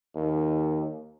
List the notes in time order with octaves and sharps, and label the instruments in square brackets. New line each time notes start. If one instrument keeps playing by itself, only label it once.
[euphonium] D#2